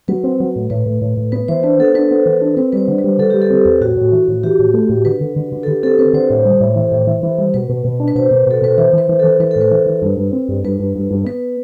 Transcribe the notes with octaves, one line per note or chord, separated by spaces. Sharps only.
F#3 B4
C4
F#3
A2
A2 B4
A2
A2
A2
B3 B4
E3 C5
D4 B4
B3 A4
D4 B4
B3
E3
D4
C4 B4
G3 B4 C5
D3
B4
G3
D3 A4
G3 G4
A4
C4
E2
A2 F#4
A2
E3
A2
E3 G4
A2
A3
A2
D3 B4
D3
D3
D3
A4
D3 G4
C4 A4
C4 B4
D3 C5
A2
G3
A2
E3
A2
E3
E3
G3
B2 B4
B2
B2
D4
B4
B2 C5
B2
B2 A4
B2 B4
E3 C5
E3 B4
E3
E3 A4
E3 B4
A2 A4
B4
E3
E3
G2
G2
C4
G2
G2 B4
G2
G2
G2
B3 B4